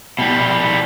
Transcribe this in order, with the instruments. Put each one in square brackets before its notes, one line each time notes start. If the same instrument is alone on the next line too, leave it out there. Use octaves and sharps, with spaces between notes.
[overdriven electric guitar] B2 G3